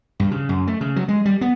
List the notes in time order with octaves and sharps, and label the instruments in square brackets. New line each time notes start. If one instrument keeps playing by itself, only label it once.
[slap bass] G2
C#3
F#2
A3
C#3
F#3
G#3
G3
B3